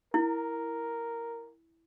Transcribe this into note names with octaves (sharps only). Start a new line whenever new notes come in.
E4 A#4